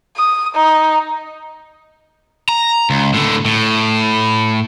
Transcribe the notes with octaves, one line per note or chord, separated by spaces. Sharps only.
D#6
D#4
A#5
C#2
A2 D3
A2